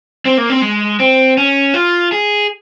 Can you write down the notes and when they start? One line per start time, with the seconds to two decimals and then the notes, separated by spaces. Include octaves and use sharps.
0.26 C4
0.38 A#3
0.50 C4
0.62 G#3
1.00 C4
1.38 C#4
1.74 F4
2.12 G#4